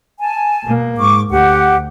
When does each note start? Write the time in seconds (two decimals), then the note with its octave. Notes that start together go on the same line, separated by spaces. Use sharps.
0.19 G#5 A5
0.65 B2 A#3
0.98 G#2 C#6 D6
1.30 D2 G4 F#5